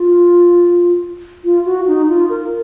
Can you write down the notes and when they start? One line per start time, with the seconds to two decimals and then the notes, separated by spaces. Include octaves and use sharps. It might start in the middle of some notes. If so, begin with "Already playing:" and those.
Already playing: F4
1.44 F4
1.65 F#4
1.87 D#4
2.08 F4
2.30 A#4